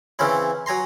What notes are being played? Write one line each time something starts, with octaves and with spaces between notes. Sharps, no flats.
C#3 E3 C4 C#4 E4
F#3 G#5 A#5 C6